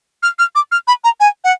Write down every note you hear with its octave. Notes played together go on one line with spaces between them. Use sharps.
F6
F6
D6
F6
B5
A#5
G#5
F#5